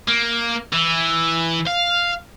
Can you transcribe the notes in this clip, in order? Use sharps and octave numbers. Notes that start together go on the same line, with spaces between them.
A#3
E3
F5